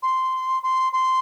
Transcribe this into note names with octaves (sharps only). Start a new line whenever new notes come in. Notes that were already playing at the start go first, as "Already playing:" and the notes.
C6
C6
C6